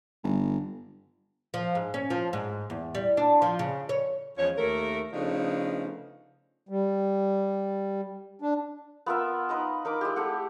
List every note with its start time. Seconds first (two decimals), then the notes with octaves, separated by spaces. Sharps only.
0.24 G1
1.54 F3
1.75 G#2
1.94 C#4
2.10 F3
2.33 G#2
2.70 E2
2.95 G3
3.17 D4
3.42 F3
3.59 C#3
3.89 C#5
4.38 E2 F3 G#3 C#4 C#5
4.57 D#2 A3 A#4
5.12 C#3 F3 A3 B3 D4 D#4
6.69 G3
8.42 D4
9.06 B3 F4 A#4 E5
9.49 D#4 B4 D#5 A#5
9.85 D#4 A#4 B5 D6
10.01 G#3 E4 G4
10.16 A3 G4 F#5